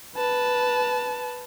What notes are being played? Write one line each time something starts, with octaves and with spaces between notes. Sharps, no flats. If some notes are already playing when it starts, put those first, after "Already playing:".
B4 A5